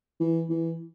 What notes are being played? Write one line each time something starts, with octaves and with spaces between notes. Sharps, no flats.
E3
E3